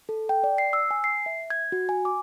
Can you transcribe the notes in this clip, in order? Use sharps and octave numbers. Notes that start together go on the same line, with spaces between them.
A4
G5
D5
C7
E6
G#5
C7
E5
G#6
F#4
G#5
D6